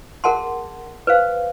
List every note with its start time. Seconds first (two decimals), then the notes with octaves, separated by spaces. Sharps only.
0.24 G#4 A#4 F#5 A5 C6
1.07 B4 C5 F5